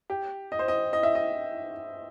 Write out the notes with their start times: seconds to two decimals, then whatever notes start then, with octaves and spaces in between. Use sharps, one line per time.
0.10 G4
0.52 D#5
0.59 C5
0.68 D#5
0.93 D#5
1.03 E5
1.15 D#5